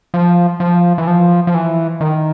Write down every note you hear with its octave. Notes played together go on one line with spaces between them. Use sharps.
F3
F3
E3
F3
F3
E3
D#3